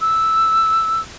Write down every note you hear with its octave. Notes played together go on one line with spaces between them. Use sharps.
E6